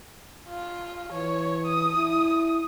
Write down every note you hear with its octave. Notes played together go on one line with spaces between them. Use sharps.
F4
E3 C#5
D#6
E4